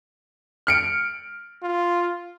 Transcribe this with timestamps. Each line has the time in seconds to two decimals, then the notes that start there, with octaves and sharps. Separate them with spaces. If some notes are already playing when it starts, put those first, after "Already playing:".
0.67 F6 C#7 D7
1.63 F4